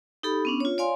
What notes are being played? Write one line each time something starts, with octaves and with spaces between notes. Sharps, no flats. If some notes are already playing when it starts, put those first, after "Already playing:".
D#4 G4 A4 B5
B3 C#4 D4
F4 C#5
C#5 D5 F5 G#5 C6